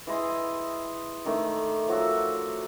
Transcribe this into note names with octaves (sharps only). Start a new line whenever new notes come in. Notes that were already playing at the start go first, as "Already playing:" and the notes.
E3 G#4 D#5 C6
D#3 A3 D4
F3 F#3 F#4 E5